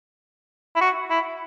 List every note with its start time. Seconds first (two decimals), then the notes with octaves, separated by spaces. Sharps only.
0.76 E4
0.81 F#4
1.10 E4